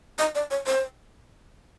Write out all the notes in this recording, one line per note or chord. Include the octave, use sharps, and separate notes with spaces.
D#5
D5
C#5
C5